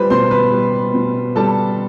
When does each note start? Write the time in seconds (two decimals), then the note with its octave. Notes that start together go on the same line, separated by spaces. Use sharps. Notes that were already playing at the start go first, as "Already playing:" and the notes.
Already playing: G3 B4 C5 B5
0.10 B2 C5 C6
0.31 B4 B5
0.52 G3
0.94 B2
1.36 G3 A4 A5